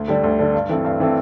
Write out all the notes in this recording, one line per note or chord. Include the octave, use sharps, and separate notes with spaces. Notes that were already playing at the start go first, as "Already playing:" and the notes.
Already playing: D2
D3 G3
D2
D3 G3
G2
E3 A3 C4
G2
E3 A3 C4